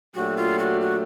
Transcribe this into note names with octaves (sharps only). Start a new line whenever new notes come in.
A#2 F#3 A3 D4 F#4 G4
F4
F#4
F#4